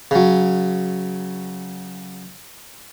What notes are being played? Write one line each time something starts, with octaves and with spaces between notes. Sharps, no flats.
C#3 F#3